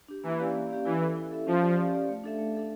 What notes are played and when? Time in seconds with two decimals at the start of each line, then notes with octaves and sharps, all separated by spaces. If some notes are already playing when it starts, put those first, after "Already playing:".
0.08 D4 G4
0.24 E3 A#3
0.39 C#4 G4 D5 F5
0.54 A#3
0.70 C#4 G4 D5 F5
0.85 E3 E4
1.01 A4 E5
1.16 E4
1.32 A4 E5
1.46 F3 C#4
1.62 G4 D5 F5
1.78 C#4
1.93 G4 D5 F5
2.09 A3
2.24 D4 A4 E5
2.39 A3
2.55 D4 A4 E5